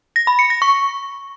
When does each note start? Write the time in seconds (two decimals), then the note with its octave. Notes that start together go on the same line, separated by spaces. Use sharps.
0.16 A#6
0.27 B5
0.39 C#7
0.50 A#6
0.62 C#6